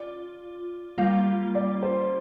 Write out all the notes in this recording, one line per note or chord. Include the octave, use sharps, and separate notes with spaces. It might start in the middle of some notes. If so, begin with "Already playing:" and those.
Already playing: F4 D5
G3 A#3 F4 F5
D5
C5